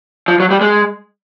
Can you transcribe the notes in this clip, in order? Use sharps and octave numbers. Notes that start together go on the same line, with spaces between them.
F3
F#3
G3
G#3